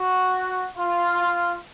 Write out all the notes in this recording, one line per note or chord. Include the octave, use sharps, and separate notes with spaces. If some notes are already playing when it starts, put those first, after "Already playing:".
Already playing: F#4
F4